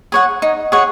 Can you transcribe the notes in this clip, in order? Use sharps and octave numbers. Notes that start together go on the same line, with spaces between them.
G#4 C#5 F#5
D#4
G#4 C#5 F#5